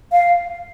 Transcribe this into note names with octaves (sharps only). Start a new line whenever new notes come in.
F5